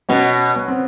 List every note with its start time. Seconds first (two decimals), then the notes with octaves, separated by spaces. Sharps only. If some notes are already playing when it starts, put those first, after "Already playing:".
0.09 B2 B3 C#4
0.56 B3
0.68 C4